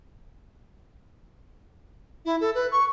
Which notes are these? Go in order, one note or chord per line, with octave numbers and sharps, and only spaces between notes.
E4
A4
B4
C#6